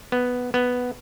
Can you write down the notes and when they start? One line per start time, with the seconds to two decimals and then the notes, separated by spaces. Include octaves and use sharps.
0.12 B3
0.54 B3